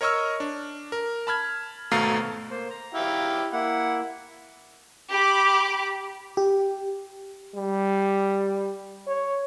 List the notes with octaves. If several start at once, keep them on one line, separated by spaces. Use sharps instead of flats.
A#4 C#5 D#5 C#6 E6 F6
D4
A#4
A5 B5 F6 G#6
G#1 B2 A3 F5 A#5 C7
A#3 C5
A#5
E4 G4 F5
A#3 E4 F#5
G4 B5 D6
G4
G3
C#5